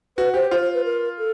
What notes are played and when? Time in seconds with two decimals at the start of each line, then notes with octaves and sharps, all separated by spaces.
0.17 F#4 B4
0.34 G4 C5
0.51 F4 C5
0.61 C5
0.74 B4
0.84 A#4
1.18 A4